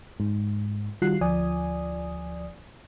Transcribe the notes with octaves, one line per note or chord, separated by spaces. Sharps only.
G#2
D#3 G3 F4 F#4 F#6 C7
D2 F3 D5 G#5 D#6